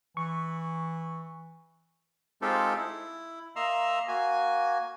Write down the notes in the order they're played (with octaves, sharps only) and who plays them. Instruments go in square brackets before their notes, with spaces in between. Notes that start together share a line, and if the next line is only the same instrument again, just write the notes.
[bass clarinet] E3 [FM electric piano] C#6
[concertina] G#3 C4 D#4 F4 G4 A4
E4
A#3 D#5 E5 A#5 C6 E6
A#3 F#4 G#5